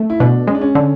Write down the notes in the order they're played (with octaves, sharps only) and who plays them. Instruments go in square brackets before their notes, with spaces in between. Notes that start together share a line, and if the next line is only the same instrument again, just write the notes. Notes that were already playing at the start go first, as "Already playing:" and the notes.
Already playing: [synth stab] A3
[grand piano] E4
[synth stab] B2 [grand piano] D4
[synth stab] G#3 [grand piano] C#4
[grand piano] D4
C#4
[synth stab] D3